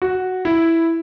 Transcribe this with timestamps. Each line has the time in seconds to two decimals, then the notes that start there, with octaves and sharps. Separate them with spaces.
0.02 F#4
0.45 E4